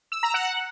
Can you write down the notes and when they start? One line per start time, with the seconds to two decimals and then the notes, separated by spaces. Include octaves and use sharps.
0.12 E6
0.23 A#5
0.34 F#5